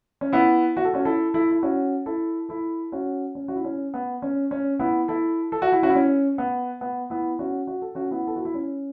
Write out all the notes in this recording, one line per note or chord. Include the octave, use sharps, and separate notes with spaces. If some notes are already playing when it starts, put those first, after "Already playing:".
C#4
B3 E4
F#4
A4
C#4 F#4
E4 A4
E4 A4
E4
C#4 F#4
E4 A4
E4 A4
C#4 F#4
C#4
F#4
E4
C#4
B3
C#4
C#4
B3 E4
E4 A4
A4
F#4
E4
C#4 F#4
E4
C#4
B3
B3
B3 E4
C#4 F#4
F#4
A4
C#4 F#4
B3 E4
A4
F#4
E4
C#4